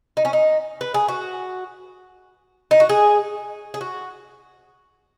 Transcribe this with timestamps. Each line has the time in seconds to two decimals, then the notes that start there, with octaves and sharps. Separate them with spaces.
0.17 D#4
0.25 C#4
0.33 D#4
0.81 B4
0.94 G#4
1.08 F#4
2.71 D#4
2.80 F#4
2.89 G#4
3.74 G#4
3.81 F#4